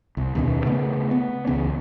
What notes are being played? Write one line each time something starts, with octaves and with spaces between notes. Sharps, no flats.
C2
D#2 B2 C#4
C#3 A3 B3
B3
C#2 C#3 E3 C#4